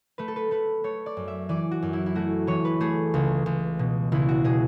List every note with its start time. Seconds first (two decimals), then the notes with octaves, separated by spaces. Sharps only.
0.18 A3 B4
0.28 A4
0.36 B4
0.51 A3 B4
0.84 A3 C#5
1.06 D5
1.17 F#2
1.28 E5
1.49 E3 D5
1.71 F#4
1.82 F#2
1.93 E4
2.06 E4
2.15 A3 F#4
2.47 E3 C#5
2.65 B4
2.80 A3 G#4
3.14 C#2
3.46 C#2
3.79 B2
4.12 C#2 E4
4.29 F#4
4.44 B2 G#4